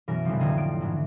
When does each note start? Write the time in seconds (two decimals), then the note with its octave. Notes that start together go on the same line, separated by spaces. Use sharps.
0.08 F#2 B2 E3 A#4
0.25 G1 D2 C3 F3
0.39 A1 F2 D3 D#5 G#6
0.57 D7
0.81 D2 G#2 E3